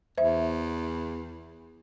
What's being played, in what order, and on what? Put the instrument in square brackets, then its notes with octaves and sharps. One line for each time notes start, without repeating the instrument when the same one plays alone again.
[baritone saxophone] E2 [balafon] C5 E5